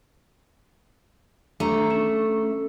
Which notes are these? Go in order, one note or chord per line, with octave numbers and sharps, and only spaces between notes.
A3 D4 A#5
C#4